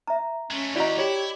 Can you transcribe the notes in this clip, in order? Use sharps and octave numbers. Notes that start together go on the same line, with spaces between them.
E5 A#5
G#3 A3 C#4
D#2 E4 F#4 G4 D5 D#5 A#5
E4 G4 C#5